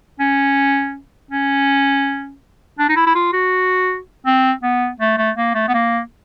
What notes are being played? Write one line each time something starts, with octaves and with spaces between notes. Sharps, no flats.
C#4
C#4
D4
D#4
E4
E4
F4
F#4
C4
B3
A3
A3
A#3
A3
B3
A#3